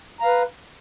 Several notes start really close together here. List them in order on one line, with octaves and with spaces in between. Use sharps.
A#5 F5 B4